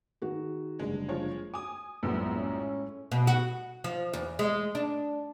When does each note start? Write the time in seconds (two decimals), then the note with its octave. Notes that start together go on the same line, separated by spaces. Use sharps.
0.22 D#3 F#4 G#4
0.79 F#1 G2 D3 G#3
1.08 F3 G#3 C#5
1.54 G#5 D6 D#6
2.03 A#1 F#2 A2 G#3 B3
2.37 C#4
3.12 B2
3.27 F#4
3.84 F3
4.13 E2
4.39 G#3
4.75 D4